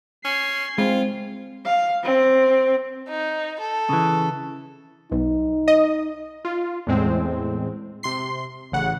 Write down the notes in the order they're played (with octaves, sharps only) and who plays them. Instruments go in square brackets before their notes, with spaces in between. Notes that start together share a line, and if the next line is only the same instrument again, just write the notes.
[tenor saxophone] C#4 [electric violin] G#6 C7
[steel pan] G#3 [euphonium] C4 [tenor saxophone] F4
[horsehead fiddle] F5
C4
[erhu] D#4
A4
[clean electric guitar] C#3 E3
[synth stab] B1 [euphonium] D#4
[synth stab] D#5
[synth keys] F4
E2 A2 G#3 C4
C3 C6 C7
A1 C#3 F#5